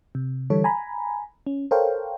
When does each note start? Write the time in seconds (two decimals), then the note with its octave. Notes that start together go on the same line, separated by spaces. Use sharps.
0.15 C3
0.50 D3 E3 G3 A4 C#5
0.64 G#5 A#5 B5
1.46 C#4
1.71 A4 A#4 C5 C#5 F5 G5